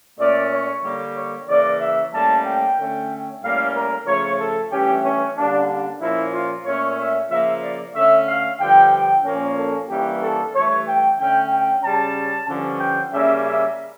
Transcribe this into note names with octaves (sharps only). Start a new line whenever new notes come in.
A#2 A3 C#4 D5
C#5
D3 G3 A#3
C#5
C#3 E3 A#3 C#4 D5
E5
A2 G3 A#3 C#4 A5
G5
D3 A3 C#4
A2 G3 A#3 C#4 F5
A#4
C#3 F3 A3 C#5
A4
G2 E3 A3 C#4 G4
C#4
D3 G3 A#3 C#4 D4
D4
A#2 F3 A#3 C#4 E4
F4
A#2 A3 C#4 C#5
E5
C#3 F3 A#3 E5
D5
D3 A3 C#4 E5
F5
G2 D3 F3 G5
G5
A#2 F3 A#3 C#4
A4
G2 E3 G3 A#3 C#4 G4
A4
G2 E3 A3 C#5
G5
D3 A3 C#4 G5
G5
C#3 G3 C#4 A5
G2 D3 F3 C#4
G5
C#3 G3 A#3 C#4 E5
E5